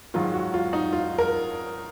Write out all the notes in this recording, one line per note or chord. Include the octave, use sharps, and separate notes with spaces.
G#2 D#3 F#3 F4
F#4
F4
D#4
F4
A#4